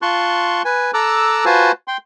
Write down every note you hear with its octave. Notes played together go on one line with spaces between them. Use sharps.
F4 A5 C6 C#6 F#6
B4 G#5
A4 A5 A#5 D6 E6 F#6
F4 F#4 B4 C5 G#5 A5
G5 C6